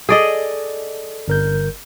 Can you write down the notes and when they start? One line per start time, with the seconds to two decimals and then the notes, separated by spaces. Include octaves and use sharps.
0.09 G#4 A4 D5 D#5
1.28 G1 A#4 G6